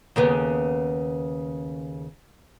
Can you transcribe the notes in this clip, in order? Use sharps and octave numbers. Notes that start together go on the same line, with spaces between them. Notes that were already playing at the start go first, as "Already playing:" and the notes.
D#2 C#3 B3